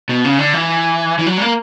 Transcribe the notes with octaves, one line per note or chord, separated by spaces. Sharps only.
B2
C#3
D3
E3
E3
F#3
G3
A#3